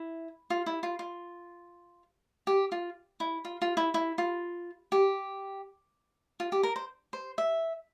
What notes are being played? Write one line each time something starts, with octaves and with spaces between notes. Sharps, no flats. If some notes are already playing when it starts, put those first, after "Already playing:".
Already playing: E4
F4
E4
F4
F4
G4
F4
E4
F4
F4
E4
E4
F4
G4
F4
G4
A#4
C5
C5
E5